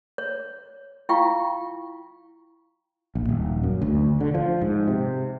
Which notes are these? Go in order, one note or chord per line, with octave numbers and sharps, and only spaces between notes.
C#5
E4 F4 F5 G5 C#6
A#1
D#1
F#2
D2
D3
F3
G#2
C3